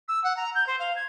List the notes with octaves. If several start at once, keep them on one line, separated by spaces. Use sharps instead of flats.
E6
F#5
A#5
G6
C5
F5
G#6